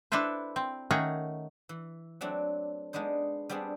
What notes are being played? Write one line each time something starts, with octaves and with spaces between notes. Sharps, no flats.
D4 E4 A4 B4 C5
C4
D#3 A3 C#4 G#4 F#5 A#5
E3
F#3 A3 C4 D4
G#3 B3 D4 D#4 C5
G3 B3 C4 D4 G#4